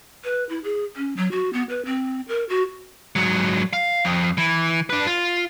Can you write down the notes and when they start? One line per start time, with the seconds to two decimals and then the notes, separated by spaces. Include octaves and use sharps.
0.24 B4
0.49 E4
0.64 G#4
0.96 C#4
1.17 F#3
1.32 F#4
1.53 B3
1.70 B4
1.85 C4
2.29 A#4
2.49 F#4
3.16 G#2 F#3
3.73 F5
4.05 F2
4.38 E3
4.90 D4 B4
5.06 F4